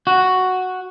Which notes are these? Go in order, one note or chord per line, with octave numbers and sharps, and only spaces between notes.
F#4